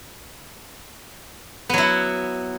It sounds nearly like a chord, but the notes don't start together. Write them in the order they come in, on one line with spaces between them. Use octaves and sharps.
B3 F#3 E4